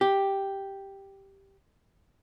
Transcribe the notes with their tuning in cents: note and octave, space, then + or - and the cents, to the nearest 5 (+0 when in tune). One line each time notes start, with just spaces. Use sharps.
G4 +0